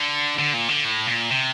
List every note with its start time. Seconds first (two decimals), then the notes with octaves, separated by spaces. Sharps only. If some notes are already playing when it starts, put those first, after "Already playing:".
Already playing: D3
0.39 D3
0.53 A#2
0.69 D3
0.85 A2
1.07 A#2
1.30 C3